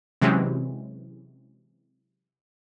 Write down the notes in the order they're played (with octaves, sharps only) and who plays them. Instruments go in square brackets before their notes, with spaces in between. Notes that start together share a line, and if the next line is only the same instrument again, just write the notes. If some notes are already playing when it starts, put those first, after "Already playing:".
[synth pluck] C3 E3 F#3 G#3 C4 C#4